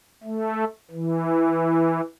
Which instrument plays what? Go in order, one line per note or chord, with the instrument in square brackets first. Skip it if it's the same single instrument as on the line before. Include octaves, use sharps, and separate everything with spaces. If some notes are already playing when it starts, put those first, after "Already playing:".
[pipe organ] A3
E3